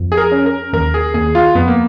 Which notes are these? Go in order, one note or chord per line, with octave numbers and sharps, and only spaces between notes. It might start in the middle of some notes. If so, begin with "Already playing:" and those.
Already playing: F2
G#4
A#4
C#4
A#4
D#2 A#4
G#4
D#2 G#4
F4
F2 B3
A#3